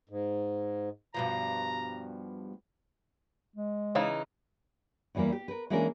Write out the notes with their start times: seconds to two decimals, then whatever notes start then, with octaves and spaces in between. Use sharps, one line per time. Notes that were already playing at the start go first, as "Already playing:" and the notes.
0.09 G#2
1.14 G2 B2 F3 A#5
3.56 G#3
3.95 C#3 E3 D#4 C5 C#5 F5
5.15 E2 D3 E3 G3 A#3
5.32 G4
5.48 A#4 B4
5.70 E3 G#3 A#3 C#4 D4 A#4